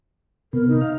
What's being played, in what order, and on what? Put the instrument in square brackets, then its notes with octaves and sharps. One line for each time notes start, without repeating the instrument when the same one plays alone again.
[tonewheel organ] C3 B3 [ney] A#4
[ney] D#4
[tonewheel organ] F5